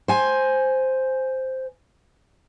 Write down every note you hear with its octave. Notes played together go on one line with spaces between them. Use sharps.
C5 G#5